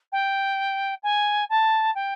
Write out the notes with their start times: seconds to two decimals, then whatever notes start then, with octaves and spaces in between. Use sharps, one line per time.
0.12 G5
1.03 G#5
1.50 A5
1.95 G5